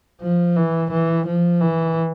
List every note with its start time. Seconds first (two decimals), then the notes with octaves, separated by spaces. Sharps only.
0.21 F3
0.56 E3
0.91 E3
1.27 F3
1.61 E3